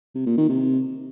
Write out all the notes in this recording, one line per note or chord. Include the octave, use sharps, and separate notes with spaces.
C3
A#2
D#3
C3